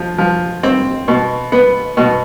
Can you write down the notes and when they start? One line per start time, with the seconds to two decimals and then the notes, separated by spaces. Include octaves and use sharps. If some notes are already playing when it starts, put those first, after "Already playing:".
Already playing: F3
0.18 F3
0.63 C4
1.08 B2
1.52 B3
1.97 B2